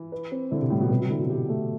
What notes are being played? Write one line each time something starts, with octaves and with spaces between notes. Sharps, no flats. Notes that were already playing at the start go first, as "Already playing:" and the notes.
Already playing: E3
B4
C4
D3 E4
C3
A2 G3
B2
C3 B4
F#3
D3 E4
B2
G4
A3